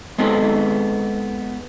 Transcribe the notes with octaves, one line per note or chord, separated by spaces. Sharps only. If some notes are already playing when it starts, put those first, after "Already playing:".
G#3 B3 C4 D#4 G#4 A4